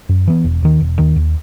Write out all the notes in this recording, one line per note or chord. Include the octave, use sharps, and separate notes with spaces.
F#2
E3 B3
E1
D#2 D#3
E1
D#2 D#3
D#2